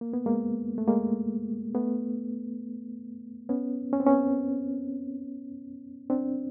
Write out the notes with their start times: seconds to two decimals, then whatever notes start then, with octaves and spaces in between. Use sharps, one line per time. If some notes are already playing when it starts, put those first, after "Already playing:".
0.01 A#3
0.13 B3
0.26 G#3 A#3
0.78 A3
0.88 G#3 A#3
1.74 A3 B3
3.49 B3 C#4
3.93 C#4
4.00 C4
4.07 B3 C#4
6.10 C4 D4